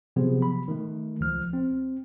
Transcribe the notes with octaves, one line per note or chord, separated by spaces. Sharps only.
C3 F3 F#3 B3 G#4
B5
D#3 A3
C#2 F3 F6
C4